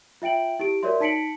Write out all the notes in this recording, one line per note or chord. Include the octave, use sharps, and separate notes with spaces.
F4 E5 G5 D7 F#7
E4 G4 D7
F#4 A#4 C#5 D5 E5 C6
D#4 A5 B6 C#7 D7 F#7